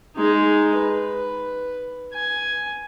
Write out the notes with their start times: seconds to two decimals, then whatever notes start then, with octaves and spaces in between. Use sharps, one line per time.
0.16 G#3 D#4
0.75 B4
2.13 G#5